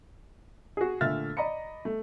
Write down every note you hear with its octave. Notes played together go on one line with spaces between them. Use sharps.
F#4 G#4
A#2 D3 A3 E5 F6 A6
D5 D#5 A#5 B5 C#7
A3